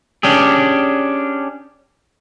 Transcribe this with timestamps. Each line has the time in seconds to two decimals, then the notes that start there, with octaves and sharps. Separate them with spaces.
0.23 C#4 D4 G4 G#4